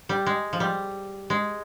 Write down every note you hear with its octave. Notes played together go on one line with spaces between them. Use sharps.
G3
G#3
F3
G3
G#3